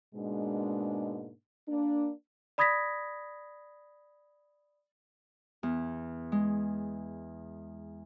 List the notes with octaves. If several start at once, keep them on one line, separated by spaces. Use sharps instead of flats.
G#2 B2 G#3 A#3 D4
A#3 D4
D5 B5 D#6 G#6 A#6 B6
E2
G#3